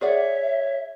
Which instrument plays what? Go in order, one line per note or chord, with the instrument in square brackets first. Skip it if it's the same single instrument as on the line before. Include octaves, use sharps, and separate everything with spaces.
[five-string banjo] G#4 D5 F#5 [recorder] C#5 [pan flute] E5